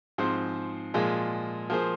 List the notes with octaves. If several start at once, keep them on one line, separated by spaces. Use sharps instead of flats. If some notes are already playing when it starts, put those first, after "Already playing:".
G#2 F3 C4 G#4 C5
A#2 F3 G#3
F3 A#3 G#4 C5